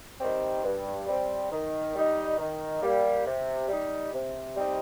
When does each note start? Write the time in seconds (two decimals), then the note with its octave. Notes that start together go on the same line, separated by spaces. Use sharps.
0.19 D#3 G3 C4
0.64 G2
1.07 G3 C4
1.51 D#3
1.94 G3 D#4
2.38 D#3
2.82 G3 A#3
3.26 C3
3.68 G3 D#4
4.13 C3
4.56 G3 C4 D#4